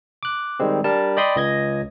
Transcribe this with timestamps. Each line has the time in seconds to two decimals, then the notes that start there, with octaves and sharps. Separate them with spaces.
0.23 D6 F#6
0.60 D#3 G3 G#3 C4
0.84 G3 D4 A#4 A5
1.17 D5 D#5 G5 B5 C6 D#6
1.36 C#2 D#5 G#6 A#6